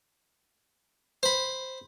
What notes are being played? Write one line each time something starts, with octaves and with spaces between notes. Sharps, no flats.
C5 B5